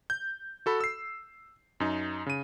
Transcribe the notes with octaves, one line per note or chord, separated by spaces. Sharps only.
G6
F#4 A4 B5
E6 C7
F#2 D#4
C#3 D#7